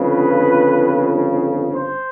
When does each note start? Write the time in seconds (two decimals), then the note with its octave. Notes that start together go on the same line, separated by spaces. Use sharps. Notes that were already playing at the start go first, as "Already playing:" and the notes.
Already playing: G1 F2 C#3 B4
1.73 C5